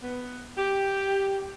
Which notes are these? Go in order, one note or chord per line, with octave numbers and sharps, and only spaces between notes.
B3
G4